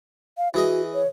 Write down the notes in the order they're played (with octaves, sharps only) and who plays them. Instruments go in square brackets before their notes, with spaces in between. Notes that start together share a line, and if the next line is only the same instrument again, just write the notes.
[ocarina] F5
[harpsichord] E3 G#4 D#5 [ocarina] F#4
[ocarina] C#5